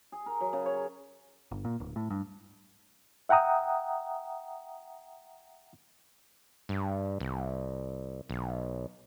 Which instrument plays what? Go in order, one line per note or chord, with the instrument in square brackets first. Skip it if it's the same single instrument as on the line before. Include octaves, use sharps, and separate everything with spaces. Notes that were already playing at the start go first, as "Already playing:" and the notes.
[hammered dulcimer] G#4
A#4
F#3
C#3
C#5
[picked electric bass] G1
A#2
D1
A2
G2
[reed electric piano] E5 F#5 G5 A#5 D#6
[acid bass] G2
C2
B1